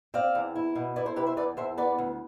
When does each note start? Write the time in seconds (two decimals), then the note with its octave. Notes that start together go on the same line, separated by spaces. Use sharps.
0.14 C4 D5 F5
0.35 E2
0.56 E4
0.76 B2
0.96 E4 B4 D5
1.06 A4 C5
1.16 C3 G4 B4
1.26 C5 E5
1.37 E2 B4 D5
1.57 E2 C5 E5
1.77 B3 B4 D5
1.98 D2